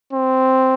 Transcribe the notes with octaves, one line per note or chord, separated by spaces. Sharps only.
C4